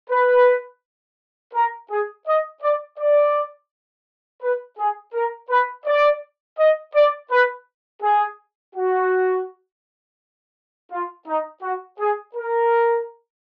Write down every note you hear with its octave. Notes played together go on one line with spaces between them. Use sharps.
B4
A#4
G#4
D#5
D5
D5
B4
G#4
A#4
B4
D5
D#5
D5
B4
G#4
F#4
F4
D#4
F#4
G#4
A#4